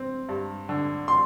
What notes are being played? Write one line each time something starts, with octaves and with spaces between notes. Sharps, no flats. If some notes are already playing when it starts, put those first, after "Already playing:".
Already playing: C4
G2
D3
C6